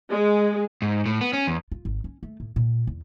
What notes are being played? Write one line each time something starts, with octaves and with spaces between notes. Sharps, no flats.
G#3
G#2
A2
B3
C#4
E2
F4
G#1
C#4
A3
A2
A#2
E2